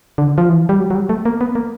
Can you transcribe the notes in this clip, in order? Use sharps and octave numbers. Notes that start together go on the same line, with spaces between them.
D3
F3
E3
G3
F#3
F#3
G3
A3
A#3
B3
A#3